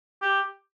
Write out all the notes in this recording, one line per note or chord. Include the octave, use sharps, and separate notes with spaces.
G4